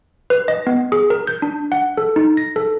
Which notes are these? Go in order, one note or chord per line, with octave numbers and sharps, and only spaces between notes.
B4
D#5
B3
G#4
A#4
G6
D4
F#5
A4
D#4
A#6
A4